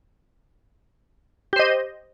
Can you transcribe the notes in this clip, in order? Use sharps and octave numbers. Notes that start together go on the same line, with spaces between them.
G4 C5 D#5